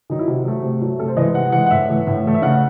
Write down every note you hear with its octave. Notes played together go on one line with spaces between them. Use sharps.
D#3 F#3 D#4
E4
C3 F#4
F#3 A3
C3
F#3 A3
C3 A4
C5
E3 G#3 D#5
C3 F#5
E3 G#3 F#5
F#5
A2 E5
E3 A3
A2
E3 A3
E5
C#3 F#5